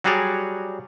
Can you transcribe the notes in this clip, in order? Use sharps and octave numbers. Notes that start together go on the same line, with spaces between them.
F#3 G3 F#4 G#4 C#5 D5